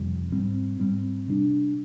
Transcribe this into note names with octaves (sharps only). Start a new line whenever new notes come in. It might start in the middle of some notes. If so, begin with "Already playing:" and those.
Already playing: F2 C3 G3
G#2 G3 C4
G#2 G3 C4
C3 G3 D4